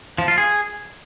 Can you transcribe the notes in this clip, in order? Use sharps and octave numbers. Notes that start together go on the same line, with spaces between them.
F3
F4
G#4